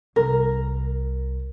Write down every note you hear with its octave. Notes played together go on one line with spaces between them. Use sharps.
C2 A#4